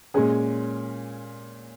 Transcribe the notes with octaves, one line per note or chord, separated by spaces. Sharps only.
A#2 G#3 C#4 G#4